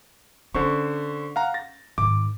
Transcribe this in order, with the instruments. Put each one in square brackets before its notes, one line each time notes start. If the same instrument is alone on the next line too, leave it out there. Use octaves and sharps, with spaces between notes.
[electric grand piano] D3 C5 C#6 [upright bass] C#4
[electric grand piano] F5 F#5 A#5
A6 A#6
[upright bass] G#2 D#3 [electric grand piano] D6